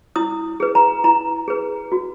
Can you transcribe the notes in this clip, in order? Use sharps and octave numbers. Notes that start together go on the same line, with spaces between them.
E4 D#6
G#4 B4
A#5
E4 A#5
G#4 B4
F#4